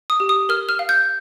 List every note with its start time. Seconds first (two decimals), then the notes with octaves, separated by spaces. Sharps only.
0.10 D#6
0.20 G4
0.29 D#6
0.49 A#4 F6
0.69 F6
0.79 F5
0.89 G6